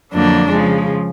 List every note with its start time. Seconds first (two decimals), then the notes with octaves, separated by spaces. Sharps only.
0.13 F2 D3 F#3 A#3 D4
0.51 C#3 F3 G#3